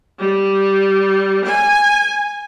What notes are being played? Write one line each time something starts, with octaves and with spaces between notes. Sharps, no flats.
G3
G#5